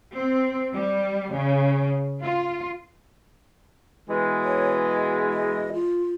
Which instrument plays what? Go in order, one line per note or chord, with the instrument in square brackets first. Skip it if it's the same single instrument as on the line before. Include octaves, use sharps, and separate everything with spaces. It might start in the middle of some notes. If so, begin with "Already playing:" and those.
[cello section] C4
G3
C#3
F4
[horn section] B2 E3 G#3
[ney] C#5
D#5
D#5
F4